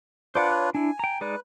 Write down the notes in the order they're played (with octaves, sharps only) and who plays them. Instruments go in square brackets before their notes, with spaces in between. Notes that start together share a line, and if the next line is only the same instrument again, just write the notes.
[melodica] D4 F4 B4 [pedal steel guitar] C5 D5 F#5
[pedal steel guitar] C#5 F#6
[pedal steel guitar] D4 E4 [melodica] G#5
[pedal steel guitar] G5 A#5
[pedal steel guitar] G#3 D#4 D5 [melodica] B4